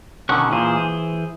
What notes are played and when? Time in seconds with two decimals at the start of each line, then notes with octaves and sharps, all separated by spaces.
0.29 B2 D3 D#3 C#4 C#6 F#6
0.51 A#2 E3 F3 G#4 C5
0.77 G#5